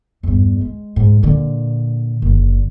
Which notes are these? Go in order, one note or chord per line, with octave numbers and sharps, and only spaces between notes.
E2 G2
G#3
G#2
A#2 D3
F#1 D3